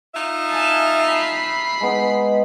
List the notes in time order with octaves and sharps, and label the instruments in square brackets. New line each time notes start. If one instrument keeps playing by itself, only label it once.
[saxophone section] D#4 F4 E5
[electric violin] G#5 A5
B5 C7
[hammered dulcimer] G#3 B3 D#4